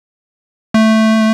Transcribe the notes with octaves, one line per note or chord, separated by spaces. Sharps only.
A3